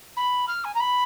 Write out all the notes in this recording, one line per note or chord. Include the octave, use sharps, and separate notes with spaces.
B5
F6
G#5
A#5
B5